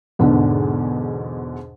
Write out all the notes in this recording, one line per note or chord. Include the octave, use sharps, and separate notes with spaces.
E2 G#2 B2 D3